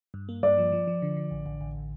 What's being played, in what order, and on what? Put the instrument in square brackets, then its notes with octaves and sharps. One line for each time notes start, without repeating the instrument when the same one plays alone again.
[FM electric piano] G2
A#3
[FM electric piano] G2 [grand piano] D5
[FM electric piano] F3
F3
F3
D3
D3
A1
A1
A1